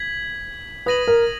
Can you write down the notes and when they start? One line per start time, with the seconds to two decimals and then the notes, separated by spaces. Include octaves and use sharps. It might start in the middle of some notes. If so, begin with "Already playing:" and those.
Already playing: G#6 B6 F#7
0.86 B4 D#6 A#6 D#7 F#7
1.07 A#4